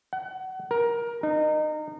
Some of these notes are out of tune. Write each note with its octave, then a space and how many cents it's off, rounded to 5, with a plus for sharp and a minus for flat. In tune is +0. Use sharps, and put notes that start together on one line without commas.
F#5 +30
A#4 +15
D#4 -25